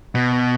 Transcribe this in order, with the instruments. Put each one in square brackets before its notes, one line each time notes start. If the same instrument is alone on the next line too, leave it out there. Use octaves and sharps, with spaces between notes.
[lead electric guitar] B2